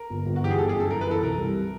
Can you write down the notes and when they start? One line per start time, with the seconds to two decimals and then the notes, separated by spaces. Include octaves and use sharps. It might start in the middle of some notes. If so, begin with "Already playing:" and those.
Already playing: A#4
0.10 G1
0.26 G1
0.36 F#4
0.41 E3 G4
0.51 G#4
0.57 G1 A4
0.69 G#4
0.74 F#2
0.80 A4
0.90 E3 A#4
1.01 B4
1.07 E3 A4
1.22 C2 A#4
1.38 G3